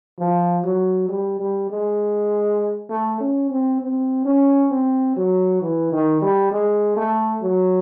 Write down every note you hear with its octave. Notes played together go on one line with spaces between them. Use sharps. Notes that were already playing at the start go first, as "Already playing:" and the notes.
F3
F#3
G3
G3
G#3
A3
C#4
C4
C4
C#4
C4
F#3
E3
D#3
G3
G#3
A3
F#3